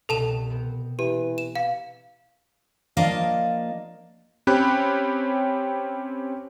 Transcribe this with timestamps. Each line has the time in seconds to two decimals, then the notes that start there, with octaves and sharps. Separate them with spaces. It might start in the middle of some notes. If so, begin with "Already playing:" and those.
0.09 C2 B2 A4 A5 E7
0.50 B3 C4
0.99 E3 G4
1.38 E7
1.55 F5
2.97 F3 A#3 D4 D#5 F5
4.47 C4 C#4 G4 C#5 B5 F#6